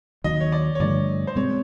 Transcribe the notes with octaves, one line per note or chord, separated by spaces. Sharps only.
D#2 D#3 F#3 D#5
C#5
D5
C#5
G2 D3 F3 A3 D5
C5
B2 G#3 C4 C#5